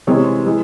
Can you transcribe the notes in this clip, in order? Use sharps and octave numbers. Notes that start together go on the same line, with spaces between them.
C3 E3 G#3 C4 C#5
E3 G#3